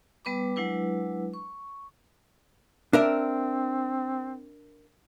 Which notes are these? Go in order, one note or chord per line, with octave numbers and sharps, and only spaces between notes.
G3 B3 B4 B5 D6
F#3 G#3 D4 E4 B4
C#6
C4 D4 A#4 E5